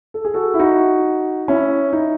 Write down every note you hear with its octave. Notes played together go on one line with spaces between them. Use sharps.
A4
G#4
F#4 A4
E4
D#4 F#4
C#4 E4
D#4